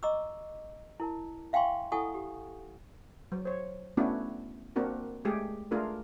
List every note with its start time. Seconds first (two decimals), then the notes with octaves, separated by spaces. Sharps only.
0.03 D#5 A#5 C#6 D6 E6
1.00 E4 A#4 A5
1.53 E5 F5 G5 G#5 C6 C#6
1.92 E4 A4 F#5 G#5 C#6 D#6
2.14 G4
3.32 F#3
3.45 C5 C#5
3.97 A3 B3 C#4 D4 E4 F#4
4.76 A#3 C4 D4 F#4 A#4
5.25 G#3 A3 G4 G#4
5.71 A3 D4 F4 G#4 A#4